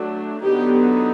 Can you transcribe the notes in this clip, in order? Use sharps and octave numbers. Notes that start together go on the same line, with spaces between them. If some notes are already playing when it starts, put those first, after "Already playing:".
Already playing: F#3 A3 D4
D3 F#3 B3 D#4 G4